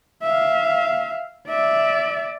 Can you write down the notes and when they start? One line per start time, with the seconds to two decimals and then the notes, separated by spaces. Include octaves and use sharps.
0.23 E5 F5
1.48 D5 E5